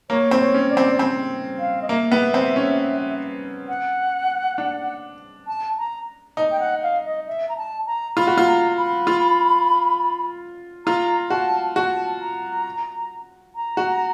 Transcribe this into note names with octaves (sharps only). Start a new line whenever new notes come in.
A#3 C#5
C4
C#5
C#4
D5
C4
C4
F5
D#5
A#3 E5
B3
C4
C#4
F#5
D4
A5
A#5
D#4
G5
F#5
F5
D#5
E5
A#5
A5
A#5
F4 B5
F#4
F4
A#5
B5
F4
F4 A#5
F#4 A5
F#4 A5
A#5
A#5
F#4